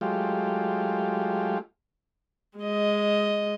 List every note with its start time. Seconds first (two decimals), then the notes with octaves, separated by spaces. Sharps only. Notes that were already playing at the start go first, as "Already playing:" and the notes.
0.01 F#3 G#3 A3 F4 G4
2.58 G#3 D#5